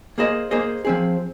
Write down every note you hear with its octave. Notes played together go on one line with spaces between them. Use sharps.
A#3 G#4 C5 D#5
A#3 G#4 C5 D#5
F3 C4 G#4